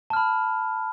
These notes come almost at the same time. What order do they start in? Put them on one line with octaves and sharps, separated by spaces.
A5 F6 B5